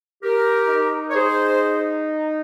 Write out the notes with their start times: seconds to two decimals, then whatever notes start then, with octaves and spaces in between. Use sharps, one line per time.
0.23 G4 A#4
0.69 D#4
1.10 C#5
1.15 G#4 C5